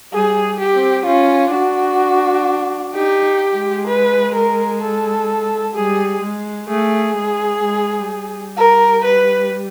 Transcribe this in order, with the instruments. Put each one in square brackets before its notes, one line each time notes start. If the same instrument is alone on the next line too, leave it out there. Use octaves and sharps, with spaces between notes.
[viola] G3 [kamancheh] G#4
[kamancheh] G4
[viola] C4
[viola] C#4 [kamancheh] F4
[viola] D4 [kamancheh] F#4
[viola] D#4 [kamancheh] G4
[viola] G#3
[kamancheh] B4
A#4
A4
[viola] G3 [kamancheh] G#4
[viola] G#3
[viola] A3 [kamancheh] G#4
[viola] G#3
G#3
G3
[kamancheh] A#4
B4